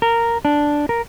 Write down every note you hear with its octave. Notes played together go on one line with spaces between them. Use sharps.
A#4
D4
A#4